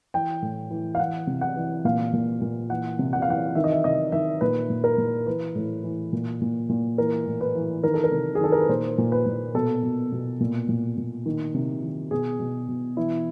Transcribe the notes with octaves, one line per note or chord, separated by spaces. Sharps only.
E3 G5
A2
E3
F5
E3 F#5
C3
F#5
E3
A#2 F5
A#2
A#2
E3 F#5
C3
F#5
F5
E3 F#5
D#3 E5
D#5
E5
C3 D#5
D#3 E5
A#2 B4
A#2
A#4
A#2
E3 B4
A2
E3
A#2
A#2
A#2
E3 A#4
A2
B4
E3
D#3 A#4
A4
A#4
C3
G#4
D#3 A4
A#4
B4
A#2 C5
A#2
B4
A#2
B2 A4
B2
B2
A#2
A#2
A#2
D#3
C3
D#3
B2 G#4
B2
B2
E3 E4